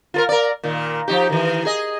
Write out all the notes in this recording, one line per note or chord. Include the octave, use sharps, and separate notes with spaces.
F4 A4 A#4
A#4 D5
A#2 D#3
F3 D#4 G4
D#3 E3
G#4 D#5